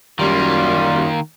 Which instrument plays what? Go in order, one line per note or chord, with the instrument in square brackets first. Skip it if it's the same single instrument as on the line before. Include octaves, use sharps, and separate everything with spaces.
[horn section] F#2 G3 [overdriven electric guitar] D#3 A#3 [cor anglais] F4